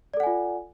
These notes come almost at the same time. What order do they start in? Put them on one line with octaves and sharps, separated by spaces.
D5 A4 F#5 G#5 F4